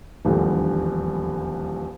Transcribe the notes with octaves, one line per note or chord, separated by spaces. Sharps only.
D#1 A#1 E2 A2 D3 G3